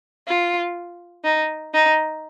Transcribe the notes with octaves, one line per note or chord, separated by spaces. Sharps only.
F4
D#4
D#4